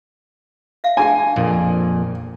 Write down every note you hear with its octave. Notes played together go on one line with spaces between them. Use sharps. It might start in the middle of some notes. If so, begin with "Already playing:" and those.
E5 F5
D4 G#4 G5 G#5
A#1 F2 A#2